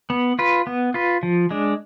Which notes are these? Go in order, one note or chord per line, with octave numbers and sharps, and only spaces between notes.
B3
F4 B4
B3
F4 B4
F3
G#3 D4